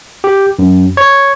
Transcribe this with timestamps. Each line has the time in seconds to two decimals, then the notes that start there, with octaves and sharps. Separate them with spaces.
0.24 G4
0.59 F#2
0.97 C#5